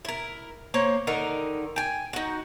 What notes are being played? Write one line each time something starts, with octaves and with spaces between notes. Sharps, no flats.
E4 A#4
A#3 C5 C#5
D3 D#3 D#4 A#4
G5 G#5
D#4 F#4